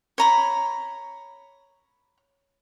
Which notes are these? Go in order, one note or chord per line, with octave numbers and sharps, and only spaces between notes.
C#5 A#5 B5